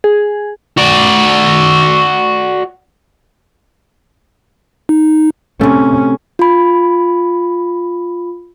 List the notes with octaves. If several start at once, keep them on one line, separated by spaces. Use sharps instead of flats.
G#4
F#4 D5
D#4
C3 A3 C#4
F4 B5